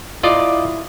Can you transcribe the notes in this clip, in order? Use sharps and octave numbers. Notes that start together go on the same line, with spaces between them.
E4 F4 D5 D#5